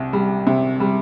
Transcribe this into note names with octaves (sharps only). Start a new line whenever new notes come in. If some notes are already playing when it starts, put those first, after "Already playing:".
Already playing: C2 C3
G3
C3
G3